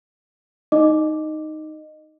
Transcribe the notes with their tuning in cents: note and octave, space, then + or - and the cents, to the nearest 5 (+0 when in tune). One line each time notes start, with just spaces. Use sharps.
D#4 +0 D#5 -15 D6 +0